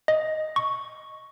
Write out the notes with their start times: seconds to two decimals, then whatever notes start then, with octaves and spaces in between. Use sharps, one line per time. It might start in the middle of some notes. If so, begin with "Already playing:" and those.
0.08 D#5
0.56 C#6